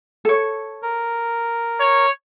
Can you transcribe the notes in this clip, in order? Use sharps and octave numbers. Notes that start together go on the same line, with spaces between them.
A4 C#5
A#4
C#5